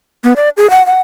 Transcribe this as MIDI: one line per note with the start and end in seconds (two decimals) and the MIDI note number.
0.24 0.33 59
0.36 0.49 74
0.57 0.69 68
0.70 0.85 78
0.86 1.01 78